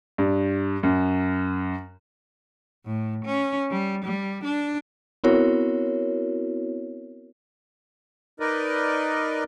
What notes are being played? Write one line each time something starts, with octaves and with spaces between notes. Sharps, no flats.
G2
F#2
A2
C#4
G3
G3
D4
B3 C4 E4 F#4 A#4 C#5
D#4 A#4 B4 D5 D#5